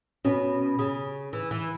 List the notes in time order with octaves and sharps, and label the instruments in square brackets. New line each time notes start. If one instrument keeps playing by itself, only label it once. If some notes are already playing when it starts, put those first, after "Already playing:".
[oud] B2 [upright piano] C#4
[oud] C#3
E3
E3